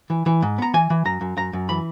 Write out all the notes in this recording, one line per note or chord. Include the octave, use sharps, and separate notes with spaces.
E3
E3
G#2
B3 A#5
E3 G#5
E3
F#2 A#5
F#2
F#2 A#5
F#2
E3 B5